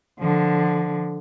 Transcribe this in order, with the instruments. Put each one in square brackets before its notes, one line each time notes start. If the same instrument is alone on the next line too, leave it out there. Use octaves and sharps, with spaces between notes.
[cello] D3 F3